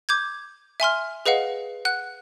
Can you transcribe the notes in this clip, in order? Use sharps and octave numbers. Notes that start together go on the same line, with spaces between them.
D6 G6 G#6
E5 G#5 C6 F6
G#4 B4 D#5 F5 F#5
F#5 F#6